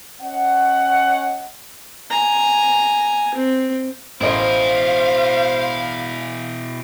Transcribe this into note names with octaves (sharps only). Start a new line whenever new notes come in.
C#4 C#5 D#5 F#5
G#5 A#5
C4
A1 B2 E4 A#4 C5 D#5 F5